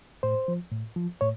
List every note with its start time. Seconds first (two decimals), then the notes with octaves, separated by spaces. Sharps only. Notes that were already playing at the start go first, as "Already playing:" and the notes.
0.23 A2 C5
0.48 F3
0.72 A2
0.96 F3
1.21 A2 C#5